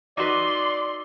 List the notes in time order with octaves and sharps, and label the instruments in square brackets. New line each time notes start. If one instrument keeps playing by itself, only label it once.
[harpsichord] D#4 F#4 B4 [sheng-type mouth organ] D5 [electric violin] C6 [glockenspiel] D6 E6 F#7